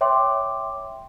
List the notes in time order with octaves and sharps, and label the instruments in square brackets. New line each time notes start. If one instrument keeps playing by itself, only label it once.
[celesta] C#5 E5 G5 C6 D6